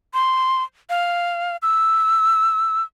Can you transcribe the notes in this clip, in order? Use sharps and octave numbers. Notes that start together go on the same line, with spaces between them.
C6
F5
E6